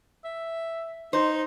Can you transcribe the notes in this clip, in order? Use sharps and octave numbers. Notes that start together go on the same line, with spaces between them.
E5
D#4 C5